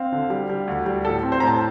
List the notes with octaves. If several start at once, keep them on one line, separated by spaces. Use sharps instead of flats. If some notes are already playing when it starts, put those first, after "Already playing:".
Already playing: C4 F5
D3
G3
G3
D2
G3
A2 A4
C4
C5
A2 A#5
A5